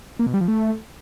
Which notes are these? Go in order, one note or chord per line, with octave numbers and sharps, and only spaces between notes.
A#3
B2
G3
F3
A3